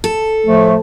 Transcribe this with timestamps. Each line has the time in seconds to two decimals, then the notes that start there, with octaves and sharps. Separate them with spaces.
0.04 A4
0.46 A2 F3 A3